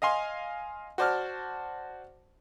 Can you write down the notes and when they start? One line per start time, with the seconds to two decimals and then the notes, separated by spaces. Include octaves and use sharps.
0.02 D#5 F5 G#5 C6
0.98 F#4 C5 D5 A5 F6